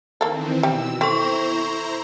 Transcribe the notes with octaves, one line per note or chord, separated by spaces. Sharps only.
D#3 E3 A#3 C4 A4
B2 G3 E6
C4 E4 A4 C5 A#5 C#6